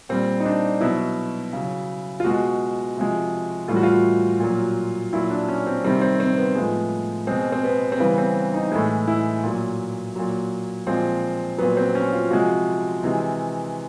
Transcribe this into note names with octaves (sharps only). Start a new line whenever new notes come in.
A#2 G3 C4
D#4
D4
B2 F#3 E4
C#3 F#3
F4
B2 G#3 F#4
C3 F3 G#3
A2 E3 G3 F4
F#4
F4
A#2 F#3
A#2 F#3 E4
D4
C#4
C4
C3 D#3 G3 C4
C4
C4
B3
A2 F3 G#3
B2 G#3 C4
C4
B3
C4
C#3 E3 G3 B3
C4
D#4
A2 E3 G#3 E4
E4
A#2 F#3
A#2 F#3
A#2 F3 G#3 C4
A#2 F#3 B3
C4
C#4
F4
C3 F3 G#3 F#4
C3 E3 G#3